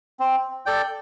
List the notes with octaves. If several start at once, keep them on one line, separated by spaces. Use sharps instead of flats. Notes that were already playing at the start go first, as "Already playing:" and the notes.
C4
A4 D5 G5